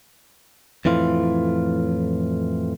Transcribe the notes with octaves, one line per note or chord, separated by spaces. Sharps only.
F2 A2 E3 F4